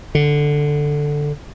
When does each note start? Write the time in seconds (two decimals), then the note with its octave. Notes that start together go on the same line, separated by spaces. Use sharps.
0.15 D3